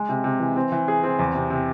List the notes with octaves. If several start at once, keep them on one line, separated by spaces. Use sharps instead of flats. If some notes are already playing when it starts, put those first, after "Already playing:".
Already playing: G#3
C3
C3
E3
C4
E3
G#4
C4
E2
C3
C3